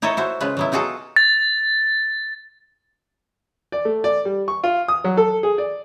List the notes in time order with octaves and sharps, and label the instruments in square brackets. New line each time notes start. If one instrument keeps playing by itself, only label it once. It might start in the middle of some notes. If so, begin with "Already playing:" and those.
[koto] D#4 E4 A4 C#5 D#5
E4 F#4 C5
C#3 G#3 F4 B4
F#3 B3 E4
D#4 F4 F#4 G#4 A4
[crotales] A6
[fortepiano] D5
A3
D5
G3
C#6
F4
D#6
F#3
A4
G#4
D5